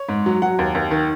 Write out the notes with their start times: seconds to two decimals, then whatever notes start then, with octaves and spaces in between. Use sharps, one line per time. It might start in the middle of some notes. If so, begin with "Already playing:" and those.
Already playing: C#5
0.09 G#2
0.26 F#3
0.42 F#3 F#5
0.59 D#2
0.75 D#2
0.91 D#3